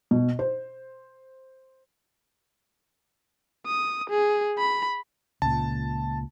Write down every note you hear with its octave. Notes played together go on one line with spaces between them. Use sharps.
B2
C5
D#6
G#4
B5
C#2 A#2 A5